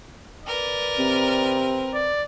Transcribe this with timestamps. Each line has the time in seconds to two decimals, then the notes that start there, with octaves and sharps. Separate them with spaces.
0.45 A#4 B4 D5
0.98 C3 C4
1.94 D5